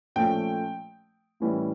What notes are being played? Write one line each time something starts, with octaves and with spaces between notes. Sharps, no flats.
A#2 F3 A3 C#4 G5
A2 E3 G3 C#4 E4